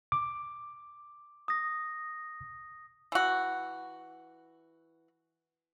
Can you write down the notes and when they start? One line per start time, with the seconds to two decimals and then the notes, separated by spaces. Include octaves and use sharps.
0.12 D6
1.48 D#6 A#6
3.12 E3 F#4